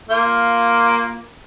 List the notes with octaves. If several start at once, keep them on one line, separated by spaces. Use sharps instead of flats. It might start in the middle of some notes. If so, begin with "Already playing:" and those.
A#3 F4